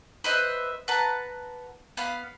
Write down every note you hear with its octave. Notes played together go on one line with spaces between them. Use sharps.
B4 C5 D#5 E5
B4 F#5 A5 A#5
B3 F5 B5